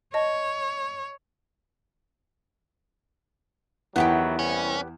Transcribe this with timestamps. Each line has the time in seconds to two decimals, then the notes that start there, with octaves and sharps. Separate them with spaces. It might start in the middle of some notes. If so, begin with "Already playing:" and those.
0.14 C#5 D#5 A5
3.96 E2 D#3 F#3 B3 E4 F#4 G4
4.39 C2 C#4